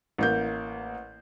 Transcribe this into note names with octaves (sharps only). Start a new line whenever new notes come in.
A1 A#3 G6